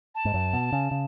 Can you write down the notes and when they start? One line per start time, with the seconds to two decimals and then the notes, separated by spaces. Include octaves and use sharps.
0.15 A5
0.25 G#2
0.34 F#2
0.53 B2
0.72 C#3
0.91 C#3